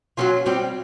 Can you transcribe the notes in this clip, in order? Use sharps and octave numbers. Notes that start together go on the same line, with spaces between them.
F#3 A3 C#4 F4
G3 C4 F4